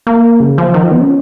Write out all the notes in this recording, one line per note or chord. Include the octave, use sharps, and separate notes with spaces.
A#3
C#3
F3
D#3
F3
B3
C#4